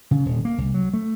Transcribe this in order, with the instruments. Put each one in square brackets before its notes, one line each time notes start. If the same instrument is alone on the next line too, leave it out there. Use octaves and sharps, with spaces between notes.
[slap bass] C#3
D#1
A#3
C2
F#3
A3